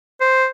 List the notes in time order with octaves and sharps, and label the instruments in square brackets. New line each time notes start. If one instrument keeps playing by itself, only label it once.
[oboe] C5